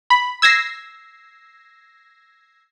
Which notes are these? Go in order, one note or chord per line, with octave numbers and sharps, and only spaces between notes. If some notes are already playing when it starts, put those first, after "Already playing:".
B5
E6 G#6 A#6 C7